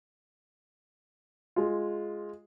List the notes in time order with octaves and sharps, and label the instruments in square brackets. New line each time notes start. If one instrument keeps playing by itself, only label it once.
[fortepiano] G#3 F4